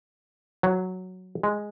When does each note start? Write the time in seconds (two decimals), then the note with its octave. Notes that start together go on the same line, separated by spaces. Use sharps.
0.63 F#3
1.43 G#3